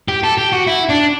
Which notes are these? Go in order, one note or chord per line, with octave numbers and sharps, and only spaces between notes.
G4
A4
G4
F#4
E4
D4